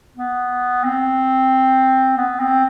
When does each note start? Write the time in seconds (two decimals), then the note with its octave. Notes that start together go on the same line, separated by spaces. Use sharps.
0.17 B3
0.84 C4
2.17 B3
2.40 C4